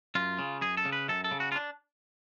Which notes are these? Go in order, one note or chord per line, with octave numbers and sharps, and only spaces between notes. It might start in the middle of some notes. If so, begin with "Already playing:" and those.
F#2 F4
C#3
F#2 G#4
A4
C#3
B4
F#2 A4
A4
C#3
F#4
F4
D4